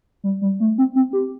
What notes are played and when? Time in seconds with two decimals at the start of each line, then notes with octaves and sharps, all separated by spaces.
0.24 G3
0.42 G3
0.60 A3
0.78 C4
0.96 C4
1.13 G4